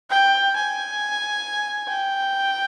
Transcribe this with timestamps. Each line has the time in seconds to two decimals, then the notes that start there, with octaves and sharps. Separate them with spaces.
0.10 G5
0.56 G#5
1.89 G5